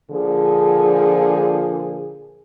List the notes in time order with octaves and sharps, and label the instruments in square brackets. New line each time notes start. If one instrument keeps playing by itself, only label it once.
[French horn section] A#2 D3 F3 G#4